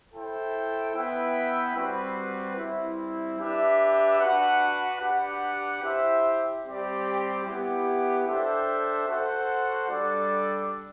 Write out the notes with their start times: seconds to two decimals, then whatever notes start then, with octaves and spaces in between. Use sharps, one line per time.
0.13 E4 A4 C5 G5
0.94 B3 E4 B4 E5 G5
1.75 G3 C4 F#4 B4
2.56 G3 C4 E4
3.38 D4 G4 B4 E5
4.19 D4 F#4 B4 F#5
5.00 D4 G4 B4 F#5
5.82 E4 G4 C5 E5 G5
6.63 G3 C4 G4 D5
7.45 B3 E4 G4
8.26 D4 A4 C5 E5 G5
9.07 F#4 A4 C5 F#5
9.88 G3 D4 A4 D5